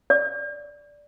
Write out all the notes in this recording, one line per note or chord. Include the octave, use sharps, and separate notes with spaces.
D5